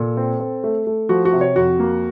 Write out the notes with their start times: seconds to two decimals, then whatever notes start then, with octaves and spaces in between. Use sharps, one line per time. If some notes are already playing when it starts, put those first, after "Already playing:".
Already playing: A#2 A4
0.17 C4
0.40 C4
0.64 A3
0.87 A3
1.09 F3 F#4
1.25 F#4
1.33 C3
1.41 C#5
1.56 F2 F#4
1.80 A#3